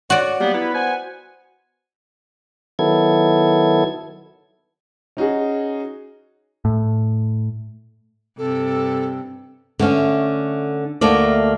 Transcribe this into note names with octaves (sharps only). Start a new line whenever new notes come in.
F#4 C#5 D5
F#3 G3 A#3 B3
B3 E4 B4
C5 F#5 G#5
D#3 F#3 B3 E4 A4 G#6
C#4 D#4 F#4 G#4
A2
G2 C3 A4
D3 A3 C#4
D2 A3 A#3 D5